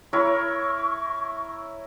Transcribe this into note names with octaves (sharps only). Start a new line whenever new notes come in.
E4 A#4 C#5 C#6